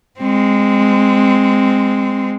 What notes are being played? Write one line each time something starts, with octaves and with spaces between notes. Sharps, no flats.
G#3 C4